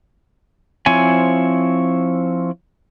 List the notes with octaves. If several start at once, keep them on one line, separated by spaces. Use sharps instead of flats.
F3 C4 E4 C#5 G#5